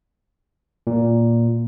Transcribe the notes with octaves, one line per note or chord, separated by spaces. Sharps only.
A#2